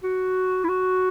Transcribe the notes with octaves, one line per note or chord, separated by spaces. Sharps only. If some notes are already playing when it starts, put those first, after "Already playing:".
F#4
E4
F#4